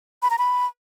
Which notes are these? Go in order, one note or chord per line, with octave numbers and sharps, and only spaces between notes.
B5
A#5
B5